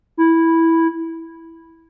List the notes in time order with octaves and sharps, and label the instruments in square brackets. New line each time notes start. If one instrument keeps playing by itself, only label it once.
[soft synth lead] E4